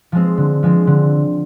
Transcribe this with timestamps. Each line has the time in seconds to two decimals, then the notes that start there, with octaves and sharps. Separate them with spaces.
0.12 F3 G#3 C4
0.37 D3
0.63 F3 G#3 C4
0.87 D3